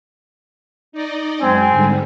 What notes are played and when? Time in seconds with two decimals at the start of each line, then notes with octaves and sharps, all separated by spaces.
0.92 D#4 D5 D#5
1.41 F#2 G#3 C4 G#5
1.69 G#2 D3 G3